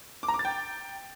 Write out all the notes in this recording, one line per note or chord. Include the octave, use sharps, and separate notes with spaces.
D6
A#5
D6
A6
G5